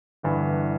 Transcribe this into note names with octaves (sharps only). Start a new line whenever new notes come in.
G1 G2 E3